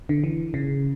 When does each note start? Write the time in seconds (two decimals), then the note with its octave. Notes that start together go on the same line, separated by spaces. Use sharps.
0.09 D3
0.24 E3
0.54 C#3